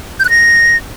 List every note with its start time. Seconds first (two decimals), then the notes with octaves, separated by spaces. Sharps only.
0.20 G6
0.25 F#6
0.30 A#6